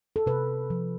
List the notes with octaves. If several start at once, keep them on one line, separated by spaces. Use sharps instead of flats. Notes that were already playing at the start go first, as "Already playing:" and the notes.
A4
C3 B4
F3